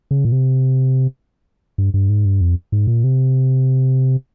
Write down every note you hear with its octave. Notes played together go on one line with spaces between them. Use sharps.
C#3
A#2
C3
G2
G2
G#2
G2
F2
G#2
A#2
C3